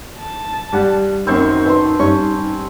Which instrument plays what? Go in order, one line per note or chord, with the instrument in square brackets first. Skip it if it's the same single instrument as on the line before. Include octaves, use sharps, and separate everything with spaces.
[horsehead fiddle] A5
[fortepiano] G2 G3 F#5
[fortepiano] F#2 D#3 [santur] C4 C5 C#6 [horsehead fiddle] D#4
[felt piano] B4 [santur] A5 C6
[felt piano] G2 [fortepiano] C#4 C#6